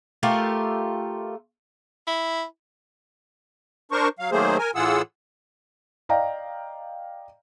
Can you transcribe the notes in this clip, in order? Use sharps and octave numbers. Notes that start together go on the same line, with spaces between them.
A3 F4 G4 A#4
E4
D4 A#4 C5 C#6
F#3 F5
D#3 F#3 A3 A#3 G#4 C5
A#4 G#5
A2 E3 F4 G#4 F#5 E6
D5 D#5 F5 G5 A#5